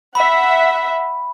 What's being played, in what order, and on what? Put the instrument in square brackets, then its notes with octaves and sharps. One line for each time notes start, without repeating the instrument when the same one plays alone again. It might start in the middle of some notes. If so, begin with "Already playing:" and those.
[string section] E5 F#5 [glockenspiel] B5